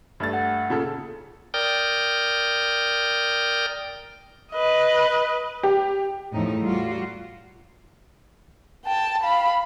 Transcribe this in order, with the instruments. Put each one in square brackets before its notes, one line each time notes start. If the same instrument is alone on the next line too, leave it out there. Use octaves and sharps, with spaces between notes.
[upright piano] G2 A3 A6
[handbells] F#5
[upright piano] A#2 C#3 A4
[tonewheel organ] A#4 D5 G5 D#6 F6 G6
[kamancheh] B4 D#5
[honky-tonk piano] G4
[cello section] E2 A2 F3 D#4
G3 F4 F#4
[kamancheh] G5 A5
F5 B5